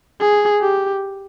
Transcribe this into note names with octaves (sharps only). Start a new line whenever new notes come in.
G#4
G4